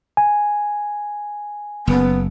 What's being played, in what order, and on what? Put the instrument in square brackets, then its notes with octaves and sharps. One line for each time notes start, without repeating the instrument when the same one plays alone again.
[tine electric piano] G#5
[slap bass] F#1 [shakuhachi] B3